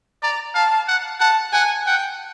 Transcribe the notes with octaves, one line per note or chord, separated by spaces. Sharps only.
D5 A#5
F5 A5
F#5
F#5 A5
F#5 G#5
F#5 G5